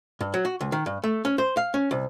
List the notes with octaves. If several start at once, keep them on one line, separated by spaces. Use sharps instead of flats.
G2
F#3
F#4
C#2
D#3
G2
A3
C#4
C5
F5
C#4
C2